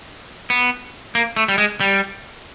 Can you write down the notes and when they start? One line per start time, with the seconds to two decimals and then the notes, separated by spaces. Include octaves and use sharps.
0.50 B3
1.15 A#3
1.36 A3
1.48 G3
1.58 G#3
1.80 G3